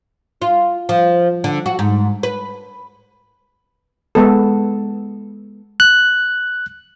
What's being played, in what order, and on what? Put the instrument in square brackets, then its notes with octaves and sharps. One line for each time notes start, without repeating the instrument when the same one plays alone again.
[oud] F4
F3
D3
F#4
G#2
B4
[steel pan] G#3 B3 A4
[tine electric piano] F#6